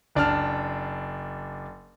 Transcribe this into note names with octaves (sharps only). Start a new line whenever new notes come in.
F#1 D4 A5 F6